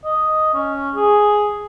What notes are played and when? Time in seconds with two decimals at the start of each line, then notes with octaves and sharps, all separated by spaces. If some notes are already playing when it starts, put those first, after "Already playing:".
0.05 D#5
0.54 C#4
0.95 G#4